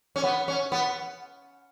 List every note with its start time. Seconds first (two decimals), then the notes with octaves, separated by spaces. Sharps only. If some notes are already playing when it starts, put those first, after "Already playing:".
0.16 C#4
0.23 B3
0.48 C#4
0.72 B3